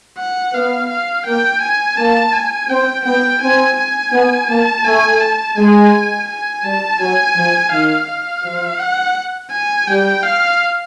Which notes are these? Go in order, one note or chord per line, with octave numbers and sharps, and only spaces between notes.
F#5
B3 F5
F5
A#3 G5
G#5
A#3 A5
G#5
C4 G5
B3 G5
C4 G#5
G#5
B3
A#3 A5
A3 G#5
A5
G#3 G#5
G#5
G3 A5
F#3 G#5
F3
D#3 F5
F5
F3
F#5
G#5
G3 G5
F5